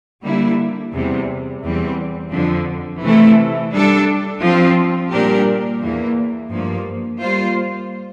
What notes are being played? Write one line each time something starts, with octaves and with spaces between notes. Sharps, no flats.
D3 G3 A#3 E4
E2 C3 E3 G3
E2 E3 G3 C4
F2 D3 F3
C3 E3 A3 E4 A4
G3 D4 A4
F3 C4 F4
A#2 G3 D4 G4 A#4
E2 E3 A#3
G2 F3 A#3
G3 A#3 F4 C5